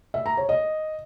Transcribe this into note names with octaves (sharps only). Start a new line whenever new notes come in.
E5
A#5
C#5
D#5